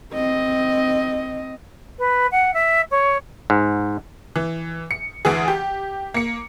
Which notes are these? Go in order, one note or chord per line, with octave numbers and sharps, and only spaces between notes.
C4 D#5
B4
F#5
E5
C#5
G#2
E3
C#7
D2 E3 G#4
G4
A#3 C#7